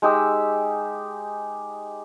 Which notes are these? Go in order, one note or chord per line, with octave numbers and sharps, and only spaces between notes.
G#3 D#4 G4 E6